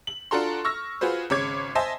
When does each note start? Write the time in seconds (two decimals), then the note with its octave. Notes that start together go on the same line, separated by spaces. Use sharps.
0.07 F#7
0.31 D4 F4 F#4 A4 A#5 C6
0.64 C#6 E6 F6 A#6
1.01 F4 F#4 G#4 B4 C5
1.30 G#1 C#3 C#5 D6 G#6
1.75 C5 D#5 E5 G#5 A5 C6